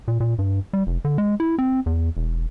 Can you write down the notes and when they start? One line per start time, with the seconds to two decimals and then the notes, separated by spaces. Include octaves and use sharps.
0.08 A#2
0.20 A#2
0.39 G2
0.73 G3
0.87 F1
1.05 D3
1.18 G#3
1.40 E4
1.58 C4
1.86 E2
2.17 E1